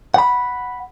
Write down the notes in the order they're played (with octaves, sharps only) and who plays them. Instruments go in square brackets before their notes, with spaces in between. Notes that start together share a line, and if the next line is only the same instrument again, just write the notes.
[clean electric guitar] F#5 B5